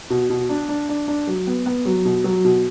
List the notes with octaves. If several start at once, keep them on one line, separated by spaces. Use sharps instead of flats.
B2
B2
D4
D4
D4
D4
F#3
B3
B3
F#3
B2
F#3
B2